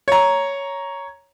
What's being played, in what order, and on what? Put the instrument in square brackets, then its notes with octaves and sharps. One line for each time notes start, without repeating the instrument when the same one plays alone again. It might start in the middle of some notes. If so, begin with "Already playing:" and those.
[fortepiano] C#5 A#5